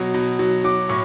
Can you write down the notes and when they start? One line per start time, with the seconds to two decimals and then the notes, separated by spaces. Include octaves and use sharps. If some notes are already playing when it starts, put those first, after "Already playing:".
Already playing: B2 F#3
0.14 B2
0.39 F#3
0.64 F#3 D6
0.89 A2 C#6